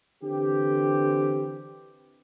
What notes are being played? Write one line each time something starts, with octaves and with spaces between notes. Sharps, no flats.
D3 E3 C4 G4